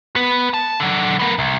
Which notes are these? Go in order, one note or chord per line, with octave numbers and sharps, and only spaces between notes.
B3 B4
A5
D3 F#3
B3 A#4
C2